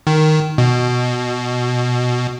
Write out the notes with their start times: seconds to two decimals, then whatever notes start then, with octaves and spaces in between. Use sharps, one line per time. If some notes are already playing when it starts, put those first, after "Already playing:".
0.07 D#3
0.58 B2